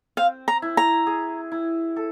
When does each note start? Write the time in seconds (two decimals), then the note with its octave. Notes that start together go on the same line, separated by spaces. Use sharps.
0.17 C4 F5
0.48 A#5
0.62 E4
0.77 A#5
1.07 G#4
1.52 E4
1.96 A4